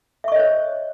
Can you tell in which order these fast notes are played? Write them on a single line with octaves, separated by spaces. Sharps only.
E5 C#6 D#5 C#5 C5